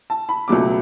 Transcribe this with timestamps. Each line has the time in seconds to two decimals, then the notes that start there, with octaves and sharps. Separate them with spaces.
0.10 A5
0.29 B5
0.48 C#2 B2 F#3 A3 D6